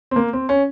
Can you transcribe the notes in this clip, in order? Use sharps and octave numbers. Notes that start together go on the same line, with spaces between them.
C4
A#3
C4
C#4